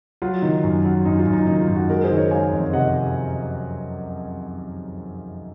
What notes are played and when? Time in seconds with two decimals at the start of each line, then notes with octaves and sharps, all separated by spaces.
0.22 F#3 F4
0.42 D#3
0.64 F#2
0.85 F#3
1.05 F#2 D#4
1.19 F4
1.27 F#2
1.33 D#4
1.47 D#3 D#4
1.62 F4
1.68 F#2
1.76 D#4 F#4
1.90 G#3 F#4 A#4
2.04 G#4 C5
2.10 D#3
2.17 A#4 C#5
2.31 G#3 F5 G#5
2.52 F2
2.73 C3 D#5 F#5